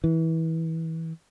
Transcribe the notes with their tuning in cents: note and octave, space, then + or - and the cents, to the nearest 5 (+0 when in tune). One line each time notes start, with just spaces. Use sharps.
E3 -25